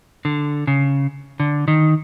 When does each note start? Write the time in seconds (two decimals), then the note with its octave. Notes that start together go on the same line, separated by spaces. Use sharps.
0.25 D3
0.67 C#3
1.40 D3
1.68 D#3